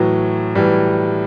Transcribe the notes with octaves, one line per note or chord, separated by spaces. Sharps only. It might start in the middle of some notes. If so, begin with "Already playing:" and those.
Already playing: A2 E3 F#3
A2 E3 G3